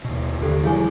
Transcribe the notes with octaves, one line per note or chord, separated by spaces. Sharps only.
D#2 B2
D#2 D3 G4 A4
D#3 F3 G3 E4 G#4 G#5